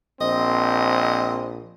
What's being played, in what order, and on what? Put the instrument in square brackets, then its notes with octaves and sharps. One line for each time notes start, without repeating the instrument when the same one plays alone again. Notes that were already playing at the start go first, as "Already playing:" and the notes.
[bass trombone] A#1 [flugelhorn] C4 [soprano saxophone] D#5